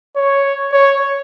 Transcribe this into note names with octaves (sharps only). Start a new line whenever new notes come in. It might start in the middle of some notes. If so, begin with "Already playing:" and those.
C#5
C#5